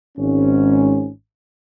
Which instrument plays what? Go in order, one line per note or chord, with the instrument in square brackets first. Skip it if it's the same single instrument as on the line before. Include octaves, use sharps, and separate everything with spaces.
[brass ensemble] G#1 G#2 C#4